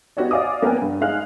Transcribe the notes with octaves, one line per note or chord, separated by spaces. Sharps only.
B3 D#4 F#4 G4 C#5 D5
D5 D#5 F5 G#5 D6 D#6
A#3 B3 A#4 G5 G#5
G2
G#3 D#4 G#4 F5 F#6